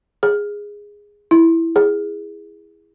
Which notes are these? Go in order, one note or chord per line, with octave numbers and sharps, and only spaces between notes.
G#4
E4
G#4